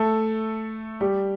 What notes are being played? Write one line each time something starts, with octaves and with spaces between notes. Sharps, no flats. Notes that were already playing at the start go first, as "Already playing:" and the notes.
Already playing: A3 A4
G3 G4